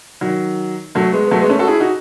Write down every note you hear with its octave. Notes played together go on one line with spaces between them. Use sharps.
D#3 F#3
F#3 A3
G#3 B3
B3
F#3 A3
G#3 B3
A3 C#4
F#4 A4
E4 G#4
D#4 F#4